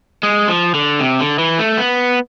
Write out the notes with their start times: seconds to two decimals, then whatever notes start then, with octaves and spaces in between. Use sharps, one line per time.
0.23 G#3
0.48 F3
0.74 D3
1.00 C3
1.20 D3
1.39 E3
1.59 A3
1.77 B3